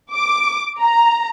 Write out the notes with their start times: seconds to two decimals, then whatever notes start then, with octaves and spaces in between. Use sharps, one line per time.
0.12 D6
0.80 A#5